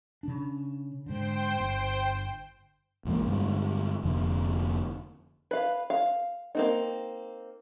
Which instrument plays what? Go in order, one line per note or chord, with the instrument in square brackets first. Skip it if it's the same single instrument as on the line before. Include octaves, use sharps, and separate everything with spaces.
[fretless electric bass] C#3 D4
[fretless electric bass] G#2 D3 [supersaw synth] C5 G5
[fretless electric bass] G1
[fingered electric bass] A#1 E2 G#3 A#3
G2 D3 G3 G#3
F1 F2 D3
[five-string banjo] B4 F5
F5
A#3 C4 D#4